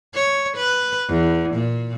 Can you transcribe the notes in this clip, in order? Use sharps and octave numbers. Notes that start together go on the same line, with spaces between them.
C#5
B4
E2
A#2